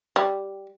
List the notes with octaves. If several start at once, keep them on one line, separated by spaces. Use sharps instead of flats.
G3